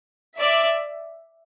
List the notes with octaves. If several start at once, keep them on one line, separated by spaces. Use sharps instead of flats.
D5 E5